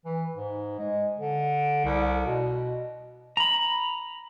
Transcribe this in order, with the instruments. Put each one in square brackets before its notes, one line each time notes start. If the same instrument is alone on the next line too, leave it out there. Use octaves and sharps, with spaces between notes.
[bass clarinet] E3
G#2
G#3
D3
C2
B2
[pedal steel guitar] A#5 B5